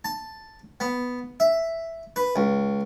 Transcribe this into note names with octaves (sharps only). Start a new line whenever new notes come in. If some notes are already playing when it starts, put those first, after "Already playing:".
A5
B3
E5
B4
C#2